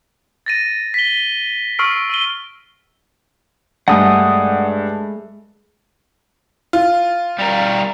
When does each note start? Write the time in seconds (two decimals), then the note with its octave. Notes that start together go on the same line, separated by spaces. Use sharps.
0.46 A6 A#6 D#7
0.94 B6 G7
1.79 C#6 E6 F6 C7 D7
2.10 E6 D#7 G7
3.88 G2 G#3 A3 F#5 D#6
6.73 F4
7.39 G3 A#4